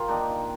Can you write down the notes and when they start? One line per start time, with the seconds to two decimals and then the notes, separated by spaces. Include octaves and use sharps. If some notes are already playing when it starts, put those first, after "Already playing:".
Already playing: F4 G4 A#4
0.08 D#3 A#3 D4 D#4